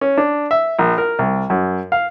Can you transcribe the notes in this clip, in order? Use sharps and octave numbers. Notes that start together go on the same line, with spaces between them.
C#4
D4
E5
A#1
A#4
C2
F#2
F5